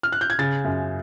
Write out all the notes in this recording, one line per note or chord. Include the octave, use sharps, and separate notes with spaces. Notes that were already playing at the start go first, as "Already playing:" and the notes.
F6
F#6
G6
G#6
C#3 A6
F#2